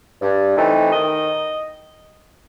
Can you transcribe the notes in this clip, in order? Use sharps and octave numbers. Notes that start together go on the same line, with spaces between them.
G2
E3 A3 C4 D#4
D#3 D#5